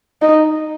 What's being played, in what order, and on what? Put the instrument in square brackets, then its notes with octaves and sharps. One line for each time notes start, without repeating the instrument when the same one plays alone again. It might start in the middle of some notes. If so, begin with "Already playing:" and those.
[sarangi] D#4